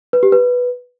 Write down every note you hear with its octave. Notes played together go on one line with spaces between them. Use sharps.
B4
G4
B4